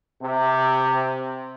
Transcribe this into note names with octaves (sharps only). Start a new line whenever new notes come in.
C3